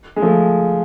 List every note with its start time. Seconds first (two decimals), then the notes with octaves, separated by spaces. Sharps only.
0.16 G#3
0.22 F3 A3